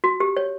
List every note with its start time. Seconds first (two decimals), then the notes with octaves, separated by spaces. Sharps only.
0.04 F#4
0.20 G4
0.37 C#5